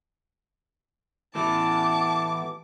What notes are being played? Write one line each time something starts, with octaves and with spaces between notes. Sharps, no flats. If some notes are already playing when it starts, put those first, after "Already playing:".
E3 A3 B3 E4 A5 D6